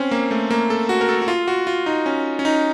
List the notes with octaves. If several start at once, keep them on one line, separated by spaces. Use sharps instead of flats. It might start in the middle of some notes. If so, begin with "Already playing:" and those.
Already playing: C4 C#4
A#3
A3
A#3
A4
F#4
A#4
A4
F#4
F4
F#4
F4
D#4
C#4
C#4
D#4